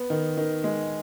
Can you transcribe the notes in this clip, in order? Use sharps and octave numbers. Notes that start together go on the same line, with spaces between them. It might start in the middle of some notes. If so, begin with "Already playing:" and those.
Already playing: B3
D#3
D#3
G#3